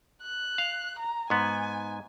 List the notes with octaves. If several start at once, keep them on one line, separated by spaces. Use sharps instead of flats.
F#6
F5
A#5
G#2 B3 G#5